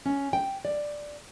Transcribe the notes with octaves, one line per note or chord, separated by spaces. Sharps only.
C#4
G5
D5